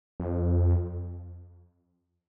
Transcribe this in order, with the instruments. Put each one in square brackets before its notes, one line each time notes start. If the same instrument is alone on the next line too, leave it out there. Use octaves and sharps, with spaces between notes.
[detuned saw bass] F2